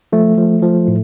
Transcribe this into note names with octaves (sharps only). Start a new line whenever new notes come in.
F3 A3
F3
F3
A2